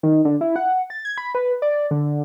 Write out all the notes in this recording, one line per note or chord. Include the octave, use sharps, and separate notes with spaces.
D#3
D3
E4
F#5
A6
G#6
B5
B4
D5
D3